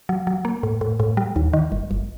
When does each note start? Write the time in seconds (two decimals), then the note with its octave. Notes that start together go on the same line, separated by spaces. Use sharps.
0.09 F#3
0.27 F#3
0.45 A#3
0.63 A2
0.81 A2
1.00 A2
1.17 G3
1.36 D#2
1.53 D#3
1.72 G1
1.91 G1